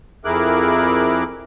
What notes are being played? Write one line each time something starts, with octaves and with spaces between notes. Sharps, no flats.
F2 E4 G#4 A#4 D6 F#6